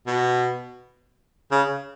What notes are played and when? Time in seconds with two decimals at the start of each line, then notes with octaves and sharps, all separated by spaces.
0.07 B2
1.52 C#3